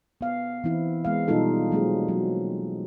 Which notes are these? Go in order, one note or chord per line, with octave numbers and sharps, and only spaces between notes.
B3 F5
E3 C4 E4
G#3 B3 F5
B2 G3 D#4 F4 A4
F#3 G#3 A#3 C4 F4 G#4
F#3